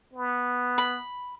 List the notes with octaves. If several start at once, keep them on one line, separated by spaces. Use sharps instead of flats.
B3
B5